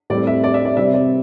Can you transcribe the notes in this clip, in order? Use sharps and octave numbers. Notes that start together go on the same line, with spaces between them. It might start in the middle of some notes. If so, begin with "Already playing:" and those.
A2 G3 C4 D5
E5
D5
E5
D5
C3 G3 C4 E5
D5